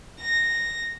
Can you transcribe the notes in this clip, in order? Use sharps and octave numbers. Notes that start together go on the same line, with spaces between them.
A#6